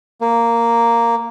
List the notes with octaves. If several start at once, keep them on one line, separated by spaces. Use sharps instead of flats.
A#3